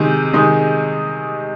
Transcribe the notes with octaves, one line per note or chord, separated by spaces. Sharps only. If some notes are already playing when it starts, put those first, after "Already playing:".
Already playing: C3 D#3 G#3 D#4
C3 D#3 G#3 D#4